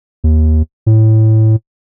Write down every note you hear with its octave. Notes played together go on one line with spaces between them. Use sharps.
D#2
A2